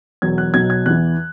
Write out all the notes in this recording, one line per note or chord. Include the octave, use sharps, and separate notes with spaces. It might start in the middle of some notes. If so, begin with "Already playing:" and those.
E1 E2 B2 F#3 G#6
F#6
B1 B2 F#3 G#6
G#6
E2 E3 F#6